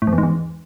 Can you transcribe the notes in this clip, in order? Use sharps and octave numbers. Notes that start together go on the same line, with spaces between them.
A2
F2
E2
G#2
E2